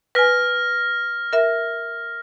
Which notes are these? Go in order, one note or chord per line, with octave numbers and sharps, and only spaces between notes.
B4 G#5 F6 A#6
A#4 E5